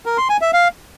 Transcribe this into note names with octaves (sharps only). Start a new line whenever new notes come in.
A#4
C6
G#5
E5
F5